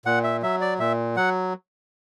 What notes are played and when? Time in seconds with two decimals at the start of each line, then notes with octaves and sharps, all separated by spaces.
0.05 A#2 F#5
0.24 E5
0.42 F#3 E5
0.61 D5
0.79 A#2 E5
1.16 F#3 F#5